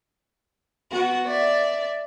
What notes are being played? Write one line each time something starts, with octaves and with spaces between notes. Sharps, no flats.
B3 F#4
D5 E5